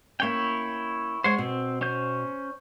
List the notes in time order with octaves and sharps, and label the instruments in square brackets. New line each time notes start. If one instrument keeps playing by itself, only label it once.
[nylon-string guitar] A#3 C#4 [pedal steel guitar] E4 C#5 G5
[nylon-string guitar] G#3 F#5 [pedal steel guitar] C5 C#5
[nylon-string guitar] B2 [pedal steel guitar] C4
[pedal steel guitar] C#4 C5 G6